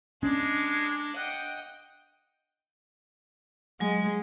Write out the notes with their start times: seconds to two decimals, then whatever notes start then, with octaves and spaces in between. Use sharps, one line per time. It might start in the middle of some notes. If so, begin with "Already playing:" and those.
0.23 G#3 C#4 D4
1.16 D#5 F#5 G5
3.80 F#3 G#3 G#5